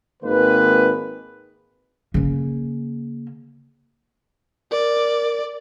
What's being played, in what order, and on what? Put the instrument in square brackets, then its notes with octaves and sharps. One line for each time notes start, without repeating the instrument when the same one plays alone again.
[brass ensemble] G#1 D#3 G#3 A#3 B4
[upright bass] C#3 A#3
[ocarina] A#4 [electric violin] D5